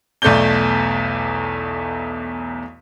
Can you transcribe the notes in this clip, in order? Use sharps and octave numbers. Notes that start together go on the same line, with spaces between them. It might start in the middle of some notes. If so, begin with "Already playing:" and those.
B1 E2 A3 D5 G6 G7